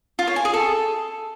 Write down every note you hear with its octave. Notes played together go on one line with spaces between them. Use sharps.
F4
C#5
G#5
G#4
A4